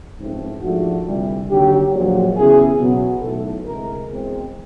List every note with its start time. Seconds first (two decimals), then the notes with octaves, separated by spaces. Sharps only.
0.19 A1 G#2 F3 A3 C4
0.62 G#2 F3 A3 D4 F4 F#4
1.05 D2 C3 E3 G3
1.49 D#2 D3 F#3 G4
1.92 A#1 A#2 F#3
2.35 E2 C#3 E3 G#4
2.80 B2 F#3 B3
3.22 B1 A2 E3 A4
3.65 D2 C3 E3 G#3 A#4
4.09 E2 B2 G#3 C4